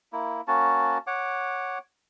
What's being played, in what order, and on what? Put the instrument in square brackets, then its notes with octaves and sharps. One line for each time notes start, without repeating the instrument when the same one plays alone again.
[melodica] A#3 E4
A#3 C#4 F#4 A5
C#5 F#5 D6